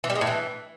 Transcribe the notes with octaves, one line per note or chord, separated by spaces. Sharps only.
E3
G3
G#3
A2
E3